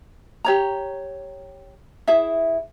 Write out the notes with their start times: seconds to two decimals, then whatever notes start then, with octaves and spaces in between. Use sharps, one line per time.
0.45 G4 C#5 A#5
2.07 E4 G#4 E5